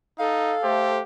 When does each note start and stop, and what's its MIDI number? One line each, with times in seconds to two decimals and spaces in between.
0.19 0.56 63
0.19 0.91 69
0.19 1.03 77
0.63 0.99 57
0.63 1.03 67
0.63 0.99 72